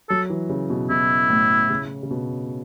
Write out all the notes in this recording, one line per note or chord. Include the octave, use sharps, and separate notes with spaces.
F#3 A4
E3
C#3
B2
B2 E4
A2
C#3
C#3
B2